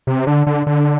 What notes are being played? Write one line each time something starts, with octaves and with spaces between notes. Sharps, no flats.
C3
D3
D3
D3